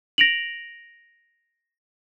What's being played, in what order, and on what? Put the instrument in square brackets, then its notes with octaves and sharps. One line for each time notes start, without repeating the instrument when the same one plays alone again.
[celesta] A#6 D7 F7 F#7